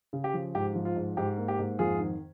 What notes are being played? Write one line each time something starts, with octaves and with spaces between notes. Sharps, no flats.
C#3
G4
F3
G#2 G4
F3
F4
G#2
G#2 G4
A#3
G4
G#2
F2 F4 G#4
D#3